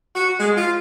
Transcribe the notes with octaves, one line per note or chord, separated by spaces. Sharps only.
F#4
G#3
F4